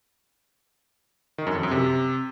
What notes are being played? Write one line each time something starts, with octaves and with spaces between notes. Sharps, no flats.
D#3
F#2
F2
F#2
C3